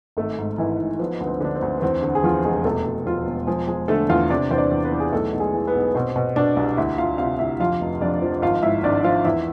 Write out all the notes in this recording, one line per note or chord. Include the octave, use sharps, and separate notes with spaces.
G#1 A3 A4
G#2
G#1 E3 E4
G#2
F3 B3
D2 B3
C4
D3 D4
C4
D2
B3
E2 C4
D3
G#4
E2 F3 F4
F1 G#3 G#4
E1 A3 A4
E1
E1 F3 F4
E1
F3 G#3 G#4
F3 G#3 G#4
D3 A3 A4
E2 F4 F5
C3 D4 D5
E2 C5
D4 D5
E2
B3 B4
E3
G#4
B1 A3 A4
B1
G#3 G#4
E3
B3 B4
B1
B2 C4 C5
B2
B2 D4 D5
C2
D2 E4 E5
D2 F4 F5
C3 F4 F5
D2 E4 E5
F2 F4 F5
F1
F2 D4 D5
F3
G#1 F4 F5
G#2 E4 E5
G#1 D4 D5
F3 F4 F5
E2 E4 E5